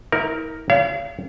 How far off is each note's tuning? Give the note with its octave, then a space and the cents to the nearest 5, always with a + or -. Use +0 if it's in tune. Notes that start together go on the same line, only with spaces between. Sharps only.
E4 -45 A#4 +0
C#5 +40 F5 -35